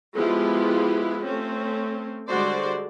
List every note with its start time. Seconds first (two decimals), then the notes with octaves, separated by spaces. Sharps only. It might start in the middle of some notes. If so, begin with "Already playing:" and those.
0.15 F3 G#3 B3 E4 F4 G4
1.23 A3 C4 C#4
2.28 D3 G3 G#3 F#4 C5 D5